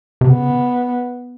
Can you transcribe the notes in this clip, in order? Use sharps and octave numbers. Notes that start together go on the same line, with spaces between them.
C3
C#3 B3